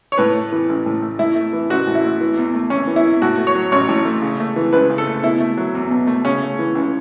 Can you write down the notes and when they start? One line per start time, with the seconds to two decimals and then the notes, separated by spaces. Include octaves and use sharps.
0.12 C#5
0.18 A2 B4
0.35 A3
0.52 E3
0.69 A1
0.86 A2
1.02 A3
1.19 A2 E4
1.35 A3
1.53 E3
1.70 A1 F#4
1.87 A2
1.95 E4
2.04 A3
2.21 E3
2.37 E2
2.54 A3
2.70 E2 C#4
2.87 E3
2.96 E4
3.04 E2
3.22 A2 F#4
3.38 A3
3.47 C#5
3.55 F#3
3.72 A1 C#5
3.88 A2
4.05 A3
4.22 C#3
4.40 A3
4.56 E3
4.73 C#2 B4
4.90 C#3
4.98 A4
5.07 A3
5.23 B2 E4
5.40 A3
5.57 F#3
5.75 E2
5.91 B2
6.07 A3
6.25 C#3 C#4
6.42 A3
6.59 E3
6.75 C#2